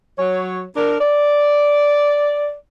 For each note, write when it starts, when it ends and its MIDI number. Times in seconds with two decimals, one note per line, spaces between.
0.19 0.62 54
0.19 0.62 73
0.76 0.97 62
0.76 0.97 70
1.00 2.53 74